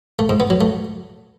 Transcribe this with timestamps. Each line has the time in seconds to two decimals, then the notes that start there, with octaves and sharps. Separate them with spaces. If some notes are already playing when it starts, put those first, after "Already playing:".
0.19 A3
0.29 G#2
0.40 B3
0.50 F#3
0.61 A3